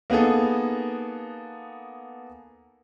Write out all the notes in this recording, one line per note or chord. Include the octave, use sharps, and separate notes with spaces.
A#3 B3 D#4 G#4 A4